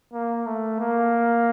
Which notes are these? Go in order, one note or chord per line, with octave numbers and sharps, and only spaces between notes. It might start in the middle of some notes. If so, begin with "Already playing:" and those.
A#3
A3
A#3